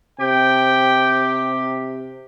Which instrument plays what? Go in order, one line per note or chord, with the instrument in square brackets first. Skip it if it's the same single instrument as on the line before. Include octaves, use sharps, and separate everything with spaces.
[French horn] C3 [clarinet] G4 [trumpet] G5